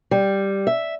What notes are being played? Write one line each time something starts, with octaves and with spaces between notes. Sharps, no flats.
G3
E5